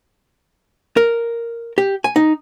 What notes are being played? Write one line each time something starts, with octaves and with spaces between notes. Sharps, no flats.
A#4
G4
G#5
D#4